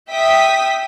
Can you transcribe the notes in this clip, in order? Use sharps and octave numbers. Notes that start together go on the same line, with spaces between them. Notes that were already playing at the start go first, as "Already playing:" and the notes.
E5 G5 D#6 B6